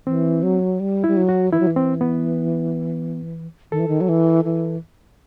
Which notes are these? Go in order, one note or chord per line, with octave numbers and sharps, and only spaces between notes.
E3 C4
F#3
G3
G3 E4
F#3
F#4
E3 E4
F#3
E3
C4
B3
D#3 A4
E3
D#3
F#3
E3
E3